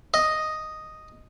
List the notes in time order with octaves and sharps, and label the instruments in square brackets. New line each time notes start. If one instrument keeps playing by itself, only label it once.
[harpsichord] D#5